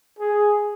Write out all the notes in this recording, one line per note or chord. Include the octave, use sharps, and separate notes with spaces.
G#4